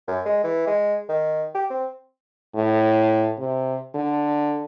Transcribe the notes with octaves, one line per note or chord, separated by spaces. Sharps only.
F#2
G#3
E3
G#3
D#3
G4
C4
A2
C3
D3